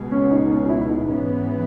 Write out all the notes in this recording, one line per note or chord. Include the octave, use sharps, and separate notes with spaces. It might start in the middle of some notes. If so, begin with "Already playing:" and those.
Already playing: C#2 B2 G#3
C#4
D#4
C#4
D#4
E4
E4
D#4
G#2 E3 B3 C#4